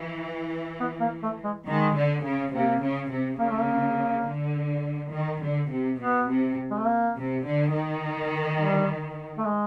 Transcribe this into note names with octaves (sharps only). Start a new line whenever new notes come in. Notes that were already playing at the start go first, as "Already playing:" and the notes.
Already playing: E3
B3
A#3
A3
G#3
D#3 G#3
D3
C#3
C3 A#3
C#3
C3
C#3 A#3
A3
A#3
D3
D#3
D3
C3
B2 B3
C3
G#3
A3
A#3
C3
D3
D#3
G3
A3
G#3